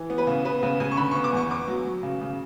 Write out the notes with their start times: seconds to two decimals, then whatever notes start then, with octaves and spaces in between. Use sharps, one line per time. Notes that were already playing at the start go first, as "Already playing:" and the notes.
Already playing: E3
0.10 B3
0.18 B4
0.27 C#3
0.45 B3 B4
0.63 C#3 B4
0.80 C#3 G#5
0.92 C#6
0.97 D3 B5
1.11 C#6
1.15 B3
1.24 D6
1.33 E2 C#6
1.51 B3 D6
1.68 F#3
1.86 F#3
2.03 C#3
2.21 C#3